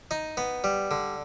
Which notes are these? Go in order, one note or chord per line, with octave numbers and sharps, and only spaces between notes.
D#4
B3
G3
D3